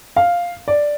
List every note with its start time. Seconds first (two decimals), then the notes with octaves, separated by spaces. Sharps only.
0.16 F5
0.68 D5